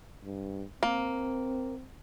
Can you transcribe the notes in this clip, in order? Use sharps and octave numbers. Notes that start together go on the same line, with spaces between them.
G2
A#3 C4